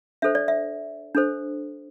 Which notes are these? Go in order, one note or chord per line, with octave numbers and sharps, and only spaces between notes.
D4 A4 C5 E5
D5
E5
D4 A4 C5